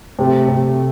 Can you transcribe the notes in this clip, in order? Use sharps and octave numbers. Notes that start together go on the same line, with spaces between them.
C3 A3
C3